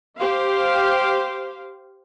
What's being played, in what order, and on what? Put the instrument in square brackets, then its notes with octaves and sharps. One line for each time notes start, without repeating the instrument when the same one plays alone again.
[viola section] G4 C5 F5